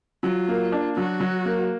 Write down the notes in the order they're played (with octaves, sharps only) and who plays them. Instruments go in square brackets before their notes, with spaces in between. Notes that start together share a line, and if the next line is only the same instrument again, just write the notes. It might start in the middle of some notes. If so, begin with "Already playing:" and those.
[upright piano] F#3 [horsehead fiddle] F4
[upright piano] A#3
D4
[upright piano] F#3 [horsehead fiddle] F#4
[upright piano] F#3
A#3